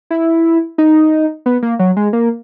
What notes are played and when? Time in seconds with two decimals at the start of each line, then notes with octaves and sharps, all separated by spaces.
0.10 E4
0.78 D#4
1.46 B3
1.62 A#3
1.79 F#3
1.97 G#3
2.13 A#3